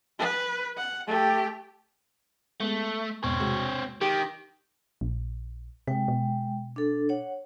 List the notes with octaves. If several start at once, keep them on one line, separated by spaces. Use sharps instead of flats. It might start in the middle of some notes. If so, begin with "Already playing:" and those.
B4
F#5
A3 G4
G#3 A3 B3
E2 G#2 B2 C4 C#5
C3 G#3 F#4
D#3 G4
A#1
C3 G#3 G5
B2
D4 A4
C#5 F#5